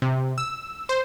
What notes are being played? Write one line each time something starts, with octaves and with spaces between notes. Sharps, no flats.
C3
E6
C5